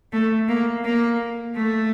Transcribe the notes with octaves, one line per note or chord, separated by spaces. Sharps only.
A3
A#3
A#3
A3